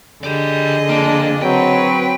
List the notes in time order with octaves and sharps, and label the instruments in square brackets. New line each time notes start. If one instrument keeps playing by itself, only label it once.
[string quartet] D3 G#4 D#5 [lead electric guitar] G4 D5
[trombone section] F2 D4 [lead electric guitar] A#3
[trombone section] F#3 [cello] C4 B4 [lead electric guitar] G5